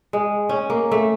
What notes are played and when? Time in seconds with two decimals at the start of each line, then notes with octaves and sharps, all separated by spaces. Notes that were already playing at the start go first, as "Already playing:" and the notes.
0.13 G#3
0.49 C#4
0.70 A#3
0.92 A3